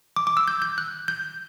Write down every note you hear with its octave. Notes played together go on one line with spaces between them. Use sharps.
D6
D6
E6
G6
G6
F#6
G6